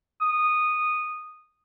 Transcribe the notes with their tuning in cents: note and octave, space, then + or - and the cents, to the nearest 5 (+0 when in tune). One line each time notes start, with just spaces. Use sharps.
D#6 -10